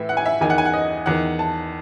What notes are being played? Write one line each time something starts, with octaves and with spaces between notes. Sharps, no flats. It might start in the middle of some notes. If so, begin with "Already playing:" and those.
Already playing: A2 E3 E5
F#5
G#5
E5
E2 D#3 G#5
F#5
G#5
F#5
D#5
E2 D#3 F#5
A5